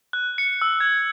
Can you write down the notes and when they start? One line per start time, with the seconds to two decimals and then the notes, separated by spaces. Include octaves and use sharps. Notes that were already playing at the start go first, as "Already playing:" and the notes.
0.13 F#6
0.38 C#7
0.62 E6
0.80 G#6